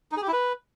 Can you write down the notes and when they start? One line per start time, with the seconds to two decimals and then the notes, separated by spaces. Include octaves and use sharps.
0.12 D#4
0.17 G#4
0.22 G4
0.28 E4
0.33 B4